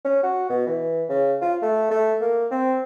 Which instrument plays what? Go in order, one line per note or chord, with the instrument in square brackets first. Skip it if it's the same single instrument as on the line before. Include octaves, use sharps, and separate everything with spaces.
[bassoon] C#4
F#4
B2
E3
C#3
F4
A3
A3
A#3
C4